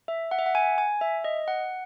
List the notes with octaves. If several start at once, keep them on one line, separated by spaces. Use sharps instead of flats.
E5
F#5
E5
F#5
G#5
G#5
E5
D#5
F#5